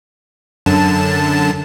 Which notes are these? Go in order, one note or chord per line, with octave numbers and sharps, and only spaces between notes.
F#2 D3 A5